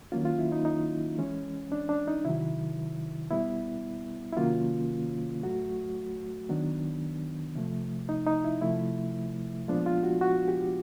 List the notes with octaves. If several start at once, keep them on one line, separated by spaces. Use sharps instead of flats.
D#3 F#3 A#3 C#4 F4
F4
E4
D#4
D#4
E3 G#3 C#4
D4
D4
D#4
C3 D#3 F#3 E4
B2 G3 B3 E4
E4
C3 D#3 F#3 A#3 C#4 F4
A2 F#3 A3 F#4
D#3 F#3 B3 D4
C3 F3 A3
D#4
D#4
E4
C3 F3 A3 E4
A#2 F3 G#3 B3 D4 F4
F4
F#4
F#4
G4